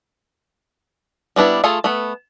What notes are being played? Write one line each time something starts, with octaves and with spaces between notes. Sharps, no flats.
G3 B3 D4 E4
A3 F4 G#4 A4
A3 B3